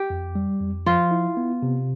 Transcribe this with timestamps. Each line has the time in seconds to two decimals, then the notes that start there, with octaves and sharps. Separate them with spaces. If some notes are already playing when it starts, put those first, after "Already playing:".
Already playing: G4
0.10 F2
0.35 G3
0.61 F2
0.86 F3 F4
1.11 E4
1.37 B3
1.62 C3